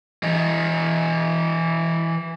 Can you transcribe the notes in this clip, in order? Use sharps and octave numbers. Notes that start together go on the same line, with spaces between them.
E3 D#5